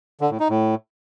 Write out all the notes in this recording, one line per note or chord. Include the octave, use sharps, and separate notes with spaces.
D3
A2
D#4
A2